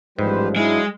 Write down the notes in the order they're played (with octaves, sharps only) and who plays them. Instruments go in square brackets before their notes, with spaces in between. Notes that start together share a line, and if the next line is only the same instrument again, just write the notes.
[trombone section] A1 F3 G3 [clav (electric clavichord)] G#2 [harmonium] G4 B4 C5
[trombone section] F#3 D4 E4 [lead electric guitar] G#3 [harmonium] D#5 F5 G#5